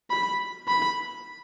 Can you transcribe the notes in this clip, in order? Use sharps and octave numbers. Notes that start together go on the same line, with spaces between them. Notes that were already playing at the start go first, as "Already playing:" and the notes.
B5
B5